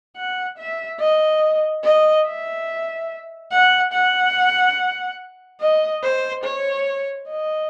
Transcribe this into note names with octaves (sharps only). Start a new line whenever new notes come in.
F#5
E5
D#5
D#5
E5
F#5
F#5
D#5
C5
C#5
D#5